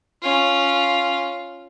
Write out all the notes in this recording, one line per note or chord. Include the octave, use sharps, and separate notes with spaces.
C#4 F4